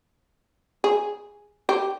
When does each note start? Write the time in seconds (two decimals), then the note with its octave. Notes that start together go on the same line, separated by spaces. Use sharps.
0.84 G#4
1.69 G4